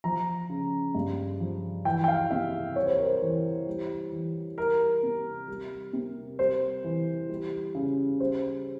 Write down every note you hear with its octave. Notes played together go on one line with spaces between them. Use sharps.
F3 A#5
C#3
G2
F3
E3 G5
G5
F5
C3 E5
G3 C#5
C5
A#4
C5
E3
G3
E3
G3 A#4
C3
G3
C3
G3 C5
E3
G3
C#3
G3 C5